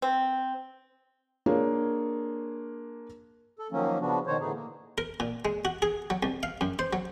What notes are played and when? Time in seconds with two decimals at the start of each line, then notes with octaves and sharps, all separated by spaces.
0.02 C4
1.46 A#3 D4 F4 G#4 C#5
3.59 A4
3.72 D#3 F3 F#3 A#3 C#4
4.01 C#3 F3 B3 D4 F#4
4.27 B2 D#3 F#4 C5 C#5
4.41 A2 D3 E3 B3 D#4 G#4
4.54 A#3
4.98 A#4
5.20 A#2
5.45 G#3
5.65 F#4
5.82 G#4
6.10 F#3
6.23 C2
6.43 F5
6.61 F#2
6.79 C5
6.93 F#3